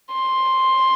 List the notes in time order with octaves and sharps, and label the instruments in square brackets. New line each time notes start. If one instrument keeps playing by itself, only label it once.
[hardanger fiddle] C6